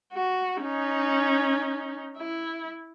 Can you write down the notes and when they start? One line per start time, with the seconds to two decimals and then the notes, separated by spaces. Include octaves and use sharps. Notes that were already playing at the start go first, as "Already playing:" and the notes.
0.13 F#4
0.62 C#4 D#4
2.18 E4